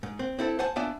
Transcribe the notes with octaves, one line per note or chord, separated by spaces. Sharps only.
G#2
C4
C4 E4 A4 E5
C5 F#5 G#5 A5
B3 D4 F4 D5 E5 G#5